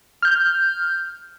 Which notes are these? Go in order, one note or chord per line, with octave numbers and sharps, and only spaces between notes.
F6 G6